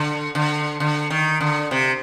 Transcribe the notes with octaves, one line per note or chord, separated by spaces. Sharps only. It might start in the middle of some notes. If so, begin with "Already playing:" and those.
Already playing: D3
D3
D3
D#3
D3
C3